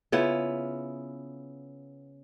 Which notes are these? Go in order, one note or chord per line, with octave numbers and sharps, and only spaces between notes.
C#3 B3 E4 F4